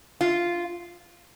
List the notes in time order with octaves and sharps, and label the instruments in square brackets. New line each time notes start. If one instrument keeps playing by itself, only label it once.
[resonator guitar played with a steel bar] F4